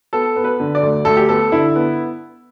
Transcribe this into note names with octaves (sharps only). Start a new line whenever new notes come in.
B3 A4
B3
B4
D3
D5
D2
D2 A4
G4
B3 A4
D3 E4
B3